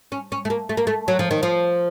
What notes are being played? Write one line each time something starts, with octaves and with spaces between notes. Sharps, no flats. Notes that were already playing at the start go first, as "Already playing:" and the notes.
C#4
C#4
A3
A#3
A3
A#3
A3
F#3
F3
D#3
F3